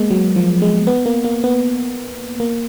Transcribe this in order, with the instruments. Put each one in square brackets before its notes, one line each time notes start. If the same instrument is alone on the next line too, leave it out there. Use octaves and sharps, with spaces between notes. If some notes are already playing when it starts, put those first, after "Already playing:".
Already playing: [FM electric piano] G#3 A#3 B3
F#3
F3
G#3
B3
A#3
A#3
B3
A#3